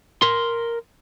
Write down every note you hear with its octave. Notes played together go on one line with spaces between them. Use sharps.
A#4 C6